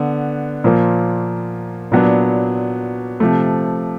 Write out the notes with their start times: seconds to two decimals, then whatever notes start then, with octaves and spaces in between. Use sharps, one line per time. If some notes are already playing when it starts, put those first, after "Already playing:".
Already playing: D3 B3
0.64 A#2 F3 A#3
1.92 A#2 F#3 B3 D4
3.20 C3 F3 A3